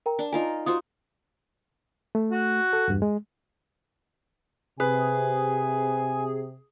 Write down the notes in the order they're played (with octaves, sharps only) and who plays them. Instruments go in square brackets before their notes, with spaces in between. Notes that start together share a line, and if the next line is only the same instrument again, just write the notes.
[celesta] A#4 G5 A#5
[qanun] D4
[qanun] D#4 F4 A#4 [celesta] G#5
[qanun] F4 F#4 C5 [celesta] D#6
[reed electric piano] A3
[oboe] F#4
[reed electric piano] A4
E2 G2
G#3
[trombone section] C3 [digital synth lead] G#4 [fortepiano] B4 [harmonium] G#5